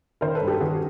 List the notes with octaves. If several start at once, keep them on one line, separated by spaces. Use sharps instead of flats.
D#3 A#4 C5
A4 B4
G2
G4 A4
D#3 F#4 G#4